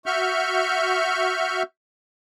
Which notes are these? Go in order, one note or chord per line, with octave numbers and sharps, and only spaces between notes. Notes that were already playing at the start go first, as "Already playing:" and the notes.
F#4 E5 C#6 F6 G6